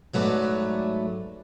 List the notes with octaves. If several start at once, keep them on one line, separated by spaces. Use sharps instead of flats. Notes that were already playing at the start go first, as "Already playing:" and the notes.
G#2 F#3 A3 B4 D5